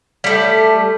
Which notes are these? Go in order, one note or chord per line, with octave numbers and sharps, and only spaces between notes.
G3 A3